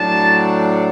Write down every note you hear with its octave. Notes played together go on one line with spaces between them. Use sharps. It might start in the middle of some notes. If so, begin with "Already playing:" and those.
Already playing: A2 F#3 D4 A5